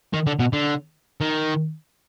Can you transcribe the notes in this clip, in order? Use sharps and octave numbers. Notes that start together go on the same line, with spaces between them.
D#3
D3
B2
D3
D#3